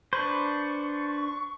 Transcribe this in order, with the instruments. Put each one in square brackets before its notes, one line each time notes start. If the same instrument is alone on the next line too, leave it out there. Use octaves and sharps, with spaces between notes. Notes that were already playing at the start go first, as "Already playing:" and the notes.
[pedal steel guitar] D4 B4 C5 [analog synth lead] C#6